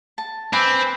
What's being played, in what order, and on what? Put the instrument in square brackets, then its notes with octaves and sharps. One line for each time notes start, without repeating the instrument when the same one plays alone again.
[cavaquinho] A5
[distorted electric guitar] C4 [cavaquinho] B4 G#5 D6